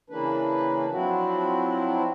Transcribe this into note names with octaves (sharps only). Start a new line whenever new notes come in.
C#3 E3 A#3 D4 B4
F3 F#3 C4 D4 E4 F#4